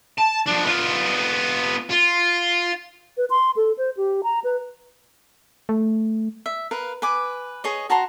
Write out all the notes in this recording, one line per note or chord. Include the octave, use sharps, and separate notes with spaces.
A5
F3 D4
B3 F4
F4
B4
C6
A4
C5
G4
A#5
B4
A3
E5
A#4 B4 F5
B4 G#5 D6
G#4 C#5 D#5
F#4 A5 A#5 C6